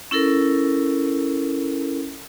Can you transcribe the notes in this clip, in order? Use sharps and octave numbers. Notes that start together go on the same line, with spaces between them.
C#4 E4 A4 A#4